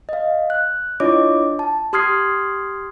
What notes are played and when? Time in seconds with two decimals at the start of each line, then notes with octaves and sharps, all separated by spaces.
0.09 D#5 F5
0.50 F#6
1.00 D4 E4 F4 C#5 D#5 D6
1.59 A5
1.93 G4 C6 D#6 F6 G#6 C7